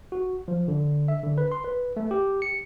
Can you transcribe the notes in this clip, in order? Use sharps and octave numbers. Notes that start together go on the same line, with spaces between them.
F#4
F3
D3
E5
D3
B4
C6
B4
A3
G4
C#7